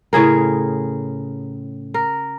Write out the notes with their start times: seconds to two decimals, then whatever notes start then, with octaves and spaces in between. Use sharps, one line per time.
0.13 A2 C#3 G#4 A#4
1.94 A#4